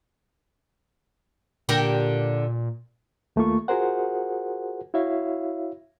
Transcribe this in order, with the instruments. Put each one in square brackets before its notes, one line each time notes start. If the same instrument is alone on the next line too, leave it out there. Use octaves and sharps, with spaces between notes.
[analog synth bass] A#2 [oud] D3 G4 A#4
[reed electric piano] D#2 A3 A#3 F4 C#6
F4 F#4 G#4 A#4 C5 F#5
E4 F#4 C#5 E5 F5